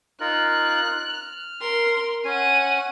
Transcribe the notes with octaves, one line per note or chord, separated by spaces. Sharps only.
D#4 F4 A#4 F#6
F6
A#4 C6
C#4 F#5 G#5 D#7